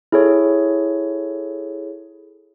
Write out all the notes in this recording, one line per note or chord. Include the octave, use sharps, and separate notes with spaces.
E4 G#4 A4 C#5